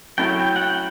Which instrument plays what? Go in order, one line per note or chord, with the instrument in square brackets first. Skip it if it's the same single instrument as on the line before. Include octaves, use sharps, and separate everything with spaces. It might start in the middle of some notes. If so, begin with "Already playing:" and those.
[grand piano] F#3 A3 C#4 E4 [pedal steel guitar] G5
[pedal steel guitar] G5
F#5
G5